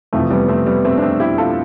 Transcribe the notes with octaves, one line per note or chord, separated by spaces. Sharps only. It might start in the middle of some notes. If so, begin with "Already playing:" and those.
F2 C3 E3 F3 A3
G3 B3
A3 C4
G3 B3
A3 C4
D4
A3 C4
E4 G4
F4 A4